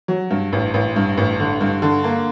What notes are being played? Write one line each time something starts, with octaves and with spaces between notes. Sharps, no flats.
F#3
G2
A1
A1
G2
A1
D3
G2
D3
A#3